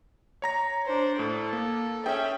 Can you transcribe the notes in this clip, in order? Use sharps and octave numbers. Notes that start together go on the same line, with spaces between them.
C#5 A#5 A#6
D4 C5
A2 A4
A#3
C#4 G#4 E5 G5